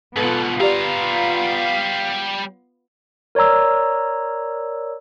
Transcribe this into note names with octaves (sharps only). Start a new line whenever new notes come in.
G#2 B2 B3 F4 A4 B4
G3 G4 D5 F5 A#5
A#4 C#5 D5 A#5 E6